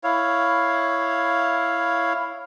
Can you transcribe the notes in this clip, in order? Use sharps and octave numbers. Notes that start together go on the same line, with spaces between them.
E4 C#5 F5